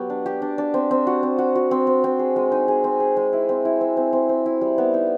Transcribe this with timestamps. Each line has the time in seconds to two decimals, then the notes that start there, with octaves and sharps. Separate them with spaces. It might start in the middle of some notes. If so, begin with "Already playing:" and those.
Already playing: F#3 B3 G4
0.10 D4
0.26 G4
0.42 D4
0.58 D4
0.74 C4
0.91 C4
1.07 F#4
1.23 C4
1.38 F#4
1.55 F#4
1.71 C4
1.87 C4
2.04 C4
2.19 G#4
2.36 G#3
2.52 D#4
2.68 G#4
2.84 C4
3.00 G#4
3.17 G#3
3.33 E4
3.49 C4
3.65 E4
3.81 C4
3.97 C4
4.13 C4
4.29 C4
4.46 E4
4.61 G3
4.78 B3
4.94 D#4